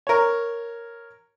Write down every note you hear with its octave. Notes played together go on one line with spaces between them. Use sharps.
A#4 C#5